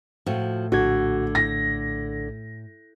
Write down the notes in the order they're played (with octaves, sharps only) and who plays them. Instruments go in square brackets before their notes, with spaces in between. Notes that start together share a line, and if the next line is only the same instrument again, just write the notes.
[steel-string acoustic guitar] A2 [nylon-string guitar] F3 F#4
[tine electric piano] A#1 A4 G#6 [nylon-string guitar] D3 [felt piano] F#4
[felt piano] A#6